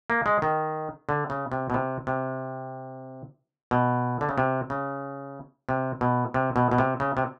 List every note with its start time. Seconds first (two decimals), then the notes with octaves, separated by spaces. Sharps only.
0.10 A#3
0.26 G#3
0.42 D#3
1.09 D3
1.30 C#3
1.52 C3
1.70 B2
1.74 C3
2.07 C3
3.71 B2
4.21 D3
4.29 C#3
4.38 C3
4.70 C#3
5.69 C3
6.01 B2
6.34 C3
6.56 B2
6.71 B2
6.78 C3
7.00 C#3
7.17 C3